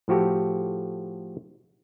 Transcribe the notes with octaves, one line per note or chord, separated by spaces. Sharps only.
A2 F3 F#4 G4 A4